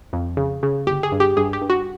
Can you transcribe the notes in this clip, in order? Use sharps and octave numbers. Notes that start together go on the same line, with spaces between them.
F2
C#3
C#3
G1 G4
G#4
G2
G4
G2 G#4
G4
G2
F#4